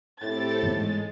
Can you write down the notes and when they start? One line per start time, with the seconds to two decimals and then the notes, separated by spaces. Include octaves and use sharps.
0.22 A2 C4 G4 A4 A6
0.63 G#2 E3 G#3 B3